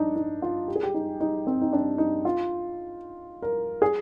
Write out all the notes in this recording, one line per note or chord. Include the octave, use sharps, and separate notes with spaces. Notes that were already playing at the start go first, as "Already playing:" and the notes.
Already playing: D4 D#4
D#4
F4
G4
G#4
G4
D#4
D#4
C4
D#4
D4
D#4
F4
A#4
G#4